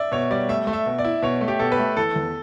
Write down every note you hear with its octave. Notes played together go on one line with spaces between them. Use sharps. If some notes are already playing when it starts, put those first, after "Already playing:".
Already playing: D5 E5
B2 C#5
G3 D5
A3 E5
A3
E5
B2
D5
E4
B2 C#5
A3
G4
B2 A4
B4
A3
E3 A4
E2